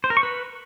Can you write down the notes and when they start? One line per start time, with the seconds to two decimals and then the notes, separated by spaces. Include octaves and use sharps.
0.04 C5
0.10 A#4
0.17 C#6
0.23 B4